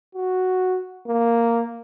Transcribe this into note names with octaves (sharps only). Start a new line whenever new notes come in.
F#4
A#3